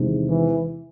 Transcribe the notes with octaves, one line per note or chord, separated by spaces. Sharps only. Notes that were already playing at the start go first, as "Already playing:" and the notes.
Already playing: E2 C3 D#3 G#3
E3